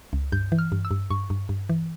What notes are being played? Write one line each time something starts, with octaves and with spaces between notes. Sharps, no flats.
C#2
G2 G6
E3
F6
G2
E6
G2
G2 C#6
G2
G2
E3